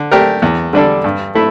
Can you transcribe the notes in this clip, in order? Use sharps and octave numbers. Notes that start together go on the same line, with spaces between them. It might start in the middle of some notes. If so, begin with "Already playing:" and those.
Already playing: D3
A3 D4 G4 A#4
E2
D3 G3 D4 A4
G2
A3 E4 A4